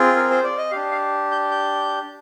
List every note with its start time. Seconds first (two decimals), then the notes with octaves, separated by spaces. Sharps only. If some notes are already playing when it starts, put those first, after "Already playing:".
Already playing: C4 F4 G#4
0.16 A#4
0.31 C5
0.44 D5
0.58 D#5
0.71 D4 G4 F5
0.91 F5
1.31 G6
1.51 G6